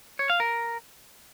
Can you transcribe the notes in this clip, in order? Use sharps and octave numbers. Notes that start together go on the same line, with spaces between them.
C#5
F5
A#4